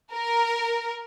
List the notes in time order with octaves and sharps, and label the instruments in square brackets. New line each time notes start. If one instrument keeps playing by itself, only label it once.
[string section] A#4